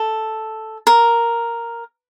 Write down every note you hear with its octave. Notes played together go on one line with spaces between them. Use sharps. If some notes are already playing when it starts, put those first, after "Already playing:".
Already playing: A4
A#4